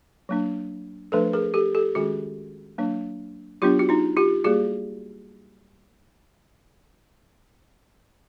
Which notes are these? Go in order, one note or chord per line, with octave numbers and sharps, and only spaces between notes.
F#3 A#3 D4
F3 A3 D4 A4 B4
G#4 A#4
G4 A4
G4 A4
D#3 G#3 C#4 F#4 G#4
F#3 A#3 D4
F#3 B3 D4 F4 G4
F#4
D#4 F4
F4 G4
G3 A#3 F#4 G#4